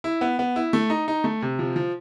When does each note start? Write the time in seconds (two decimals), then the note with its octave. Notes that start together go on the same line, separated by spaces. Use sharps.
0.04 E4
0.21 B3
0.39 B3
0.56 E4
0.73 A3
0.90 D#4
1.08 D#4
1.24 A3
1.42 C3
1.59 F3
1.76 F3